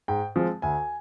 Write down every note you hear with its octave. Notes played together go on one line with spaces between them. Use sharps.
G#2 G5
F3 G#3 C4
D2 G#5